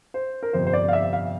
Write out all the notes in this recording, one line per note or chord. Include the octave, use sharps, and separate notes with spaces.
C5
A#4
G1 F2 C3 C5
C5
D5
F5
E5
F5